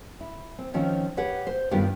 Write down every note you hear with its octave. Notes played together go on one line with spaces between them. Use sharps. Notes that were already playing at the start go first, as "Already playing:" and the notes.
E4
C4
D#3 F3 C4 C#4 F4
G4 B4 C#5 F#5
C5
G2 D#3 B3 D4 F4 G4